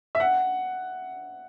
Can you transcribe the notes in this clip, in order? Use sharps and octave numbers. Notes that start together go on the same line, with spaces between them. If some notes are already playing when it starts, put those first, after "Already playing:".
E5
F#5